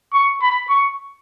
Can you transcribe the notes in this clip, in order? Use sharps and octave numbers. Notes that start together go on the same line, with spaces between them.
C#6
B5
C#6